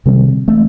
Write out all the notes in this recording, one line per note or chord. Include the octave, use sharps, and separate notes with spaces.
C3 D#3 G3 C4
E3 A3 C4